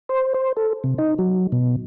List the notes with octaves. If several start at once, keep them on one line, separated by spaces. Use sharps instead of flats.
C5
C5
A4
C3
D#4
F#3
B2